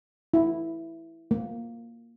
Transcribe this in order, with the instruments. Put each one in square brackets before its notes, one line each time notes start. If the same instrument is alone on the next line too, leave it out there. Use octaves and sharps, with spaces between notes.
[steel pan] E4
A#3